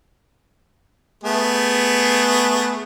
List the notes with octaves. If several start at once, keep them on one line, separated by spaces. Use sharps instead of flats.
A3 B3 G#4